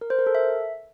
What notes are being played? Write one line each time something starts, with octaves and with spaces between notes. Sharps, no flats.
A#4
C5
A#4
A4
E5